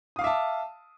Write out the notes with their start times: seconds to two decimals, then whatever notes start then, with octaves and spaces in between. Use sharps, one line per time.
0.16 D#6
0.19 F5
0.21 D6
0.24 E5
0.27 A5